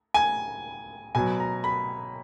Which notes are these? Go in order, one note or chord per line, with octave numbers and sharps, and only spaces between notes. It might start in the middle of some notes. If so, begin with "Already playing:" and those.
G#5
B2 F#3 G#5
A#5
B5